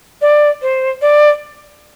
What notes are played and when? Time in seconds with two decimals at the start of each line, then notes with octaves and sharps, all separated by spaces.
0.22 D5
0.62 C5
1.02 D5